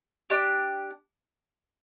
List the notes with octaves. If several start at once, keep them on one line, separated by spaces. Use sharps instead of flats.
D4 G4